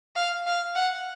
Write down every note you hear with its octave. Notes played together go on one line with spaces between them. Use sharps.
F5
F5
F#5